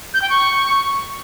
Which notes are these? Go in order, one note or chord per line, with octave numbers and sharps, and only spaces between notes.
G6
G5
C#6